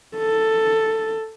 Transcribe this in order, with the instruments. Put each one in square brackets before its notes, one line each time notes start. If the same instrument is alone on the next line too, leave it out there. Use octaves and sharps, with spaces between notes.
[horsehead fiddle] A4